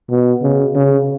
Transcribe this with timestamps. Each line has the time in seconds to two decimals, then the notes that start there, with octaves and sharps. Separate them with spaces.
0.10 B2
0.42 C#3
0.75 C#3